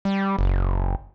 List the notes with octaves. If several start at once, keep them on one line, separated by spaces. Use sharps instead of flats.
G3
F#1